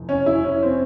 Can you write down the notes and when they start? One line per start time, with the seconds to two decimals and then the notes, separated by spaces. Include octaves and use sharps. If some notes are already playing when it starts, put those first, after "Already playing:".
Already playing: F1 E2
0.09 C#4
0.26 E4
0.44 C#4
0.63 C4